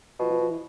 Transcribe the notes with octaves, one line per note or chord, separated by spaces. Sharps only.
B2 F3
F3
F3
E3